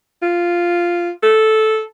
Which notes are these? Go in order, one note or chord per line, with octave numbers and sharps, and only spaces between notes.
F4
A4